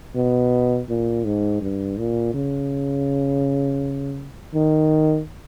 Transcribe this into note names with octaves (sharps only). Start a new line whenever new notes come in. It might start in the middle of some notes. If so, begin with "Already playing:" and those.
B2
A#2
G#2
G2
A#2
C#3
D#3